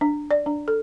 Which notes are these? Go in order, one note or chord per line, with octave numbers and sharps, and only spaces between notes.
D4
D5
D4
A4